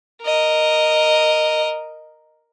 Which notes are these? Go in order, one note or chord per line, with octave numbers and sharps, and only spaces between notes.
A#4 D#5